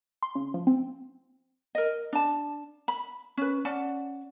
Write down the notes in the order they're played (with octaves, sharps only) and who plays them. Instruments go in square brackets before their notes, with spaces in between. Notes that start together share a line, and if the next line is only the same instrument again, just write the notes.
[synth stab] C6
C#3
F3
C4
[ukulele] A#4 D#5
D4 A5
B5
C#4 B4
C#4 D5 F#5 A5